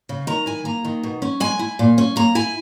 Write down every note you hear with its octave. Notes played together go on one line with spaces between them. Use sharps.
C#3
D#3 A#5
E4 G#5
A#3 A#5
D#3
B2
C#4
G#3 G#5
E4
A#2
C#4
A#3 A#5
E4 G#5